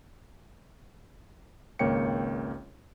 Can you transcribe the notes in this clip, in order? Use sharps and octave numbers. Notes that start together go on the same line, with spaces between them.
G#1 C#2 A#3 C#5 G5 C#7